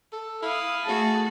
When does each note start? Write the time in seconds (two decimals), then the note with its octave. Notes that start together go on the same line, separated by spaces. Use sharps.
0.13 A4
0.42 E4 F5 D#6
0.85 A3 F#4 G#4 A5